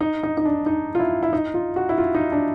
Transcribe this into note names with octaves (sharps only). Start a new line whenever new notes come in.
D#4
D#4
D#4
D4
D#4
F4
E4
E4
D#4
F4
F#4
E4
F4
D#4
D4